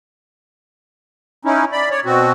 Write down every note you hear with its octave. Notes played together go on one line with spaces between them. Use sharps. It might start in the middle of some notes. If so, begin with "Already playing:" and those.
C#4 D#4 E4
D5 B5
C#5 D5
B2 C4 F#4